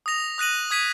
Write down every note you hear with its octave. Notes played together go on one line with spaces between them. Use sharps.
D#6 A#6 F7
D#6 F#6 A#6 D#7 F#7
D#6 G#6 B6 D#7